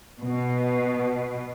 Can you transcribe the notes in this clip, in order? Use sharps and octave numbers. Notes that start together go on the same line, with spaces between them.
B2